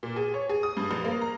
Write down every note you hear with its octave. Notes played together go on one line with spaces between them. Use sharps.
A#2
G#4
C#5
G#4
D#6
G2
A#1
A#3
A#5